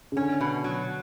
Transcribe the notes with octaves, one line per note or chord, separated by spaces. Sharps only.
C#3
D3 C#4
B2
F#3